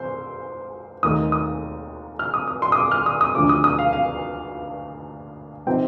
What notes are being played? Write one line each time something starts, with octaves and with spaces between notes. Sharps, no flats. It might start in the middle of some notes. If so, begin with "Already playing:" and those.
Already playing: C5 C6
D#2 D#3 A3 D#4 D#6
D#6
F6
D#6
D#6
C6
D#6
D6
F6
D#6
D#6
D2 D3 F3 D6
D#6
D#6
F5
F5
C3 F3 C4 D#4 G5